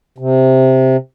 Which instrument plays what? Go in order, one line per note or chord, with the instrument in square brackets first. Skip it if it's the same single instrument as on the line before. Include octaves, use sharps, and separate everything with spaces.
[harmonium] C3